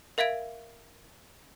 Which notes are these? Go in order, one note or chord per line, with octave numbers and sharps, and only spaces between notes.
A#4 E5 F5 G#6 D7